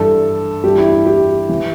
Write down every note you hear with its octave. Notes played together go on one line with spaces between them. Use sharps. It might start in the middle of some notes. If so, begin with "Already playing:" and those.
Already playing: G2 E3 A4
G2 E3 G4
E4
E4
G4
E3